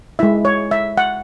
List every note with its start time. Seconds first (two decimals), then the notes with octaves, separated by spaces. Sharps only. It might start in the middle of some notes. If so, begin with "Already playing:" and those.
0.19 G#3 E4 E5
0.45 C#5
0.71 E5
0.98 F#5